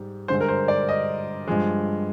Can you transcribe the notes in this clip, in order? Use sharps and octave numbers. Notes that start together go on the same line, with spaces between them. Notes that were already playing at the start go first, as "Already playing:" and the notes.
Already playing: G#2 G3
G2 D3 G#3 C5
A#4
C5
D5
D#5
G2 F3 G#3